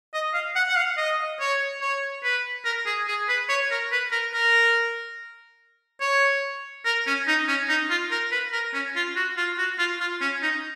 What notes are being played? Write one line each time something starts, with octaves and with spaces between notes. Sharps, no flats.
D#5
F5
F#5
F#5
F5
D#5
C#5
C#5
B4
A#4
G#4
G#4
B4
C#5
A#4
B4
A#4
A#4
C#5
A#4
C#4
D#4
C#4
D#4
F4
A#4
B4
A#4
C#4
F4
F#4
F4
F#4
F4
F4
C#4
D#4